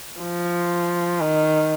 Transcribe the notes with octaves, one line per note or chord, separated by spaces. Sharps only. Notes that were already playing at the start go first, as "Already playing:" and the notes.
F3
D#3